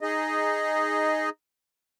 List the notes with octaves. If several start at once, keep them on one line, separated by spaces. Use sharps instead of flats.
D#4 G#4 D#5